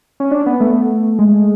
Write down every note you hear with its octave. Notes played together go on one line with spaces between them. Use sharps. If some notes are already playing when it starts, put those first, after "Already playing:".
C#4
D4
B3
A3
G#3